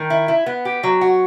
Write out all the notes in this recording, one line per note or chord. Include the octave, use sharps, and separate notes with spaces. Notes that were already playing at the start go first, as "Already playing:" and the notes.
Already playing: D#3
E4
E4
B3
G4
F#3
F#4